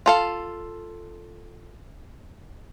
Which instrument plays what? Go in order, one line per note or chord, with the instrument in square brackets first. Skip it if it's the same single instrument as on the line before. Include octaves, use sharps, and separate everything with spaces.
[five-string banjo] F4 A4 F5